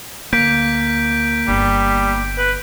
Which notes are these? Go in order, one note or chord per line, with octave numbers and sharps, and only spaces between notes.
D2 A#3 G6 B6 D7
G1 G3 B3
B4